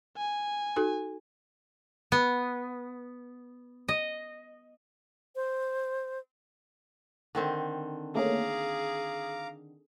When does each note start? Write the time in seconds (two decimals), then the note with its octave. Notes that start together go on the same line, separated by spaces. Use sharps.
0.17 G#5
0.76 D#4 F#4 A4
2.12 B3
3.88 D#5
5.35 C5
7.35 D3 D#3 C4
8.15 A3 A#3 C#4 G#4 F5 A#5 D6